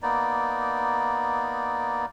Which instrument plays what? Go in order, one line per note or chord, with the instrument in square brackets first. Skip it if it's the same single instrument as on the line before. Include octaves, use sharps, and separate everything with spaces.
[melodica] A#3 B3 D#4 D5